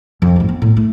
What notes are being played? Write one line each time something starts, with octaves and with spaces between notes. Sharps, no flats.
F2
D2 G#2
B3
A2
A3